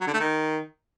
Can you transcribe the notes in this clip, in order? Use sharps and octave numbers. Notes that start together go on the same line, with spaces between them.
F#3
D3
A3
D#3